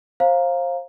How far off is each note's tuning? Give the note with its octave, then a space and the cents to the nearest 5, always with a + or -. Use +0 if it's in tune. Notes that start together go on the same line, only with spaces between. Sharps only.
C5 +30 F5 +0 A#5 +0